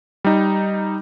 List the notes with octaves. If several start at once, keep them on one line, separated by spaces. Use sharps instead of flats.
G3 D#4